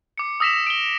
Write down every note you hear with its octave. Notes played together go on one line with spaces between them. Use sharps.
D6 C#7
D#6 E6 A#6 B6 E7 F7
D7 G7